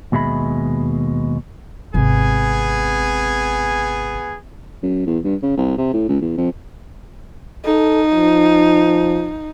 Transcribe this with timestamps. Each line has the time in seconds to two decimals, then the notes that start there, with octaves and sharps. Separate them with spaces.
0.12 D#2 B2 G#3 E5 B5
1.94 G#1 C3 B3 G#4 G#5
4.83 F#2
5.07 E2
5.24 G2
5.43 C#3
5.57 C2
5.78 C3
5.94 A2
6.09 C#2
6.22 E2
6.38 F2
7.65 D#4 A4
8.14 F3